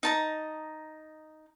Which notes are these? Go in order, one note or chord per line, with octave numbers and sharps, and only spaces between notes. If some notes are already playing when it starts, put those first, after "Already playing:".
D#4 A5 A#5